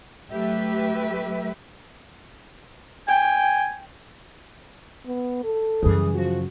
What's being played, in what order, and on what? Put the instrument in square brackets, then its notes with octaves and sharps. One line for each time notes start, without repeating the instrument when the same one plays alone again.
[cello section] F#3 A3 G4 B4 E5
[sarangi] G5 [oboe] G#5
[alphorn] B3
A4
[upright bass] F#2 C#3 [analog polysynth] E3 G3 G#4
[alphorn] F3 [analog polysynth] F#4